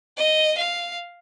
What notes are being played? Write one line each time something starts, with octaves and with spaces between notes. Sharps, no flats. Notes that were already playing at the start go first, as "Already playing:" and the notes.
D#5
F5